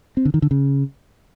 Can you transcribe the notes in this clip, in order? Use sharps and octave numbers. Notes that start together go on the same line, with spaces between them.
C4
D3
D#3
D3
C#3